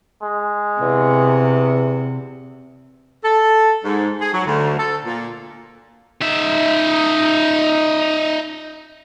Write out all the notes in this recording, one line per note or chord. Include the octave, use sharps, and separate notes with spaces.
G#3
E2 C3
A4
G#2
G#4
F#3
D2
A4
A#2
D#4 E5